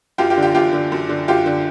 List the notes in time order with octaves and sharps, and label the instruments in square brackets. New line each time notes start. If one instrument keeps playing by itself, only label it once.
[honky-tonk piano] F#2 F4 G4
F4 G4
D3
F4 G4
F#2 F4 G4
D3
F#2
D3
F#2 F4 G4
D3